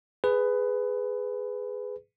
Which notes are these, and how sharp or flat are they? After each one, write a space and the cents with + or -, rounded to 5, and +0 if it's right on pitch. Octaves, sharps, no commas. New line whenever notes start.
G#4 +0 B4 +15